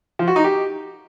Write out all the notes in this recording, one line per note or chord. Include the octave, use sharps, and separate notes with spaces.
F3
F#4
D#4
G4